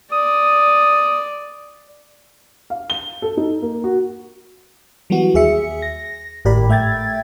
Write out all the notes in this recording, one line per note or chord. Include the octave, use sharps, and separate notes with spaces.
D5 D#6
F5
G7
A4
D#4
A#3
F#4
E3 F#3 G3 B3 F#4
D#2 G#4 E5 C#7
A#6
G#1 A2 G4 A#4 D5 B5
A3 E5 G5 G#6 A6